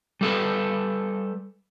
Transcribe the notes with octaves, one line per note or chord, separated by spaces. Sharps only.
G3 A4 B4